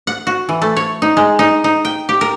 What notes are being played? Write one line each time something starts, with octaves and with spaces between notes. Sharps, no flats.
F#5
F#4
E3
A3
C#5
D#4
G#3
D#4
D#4
G5
G4
A#4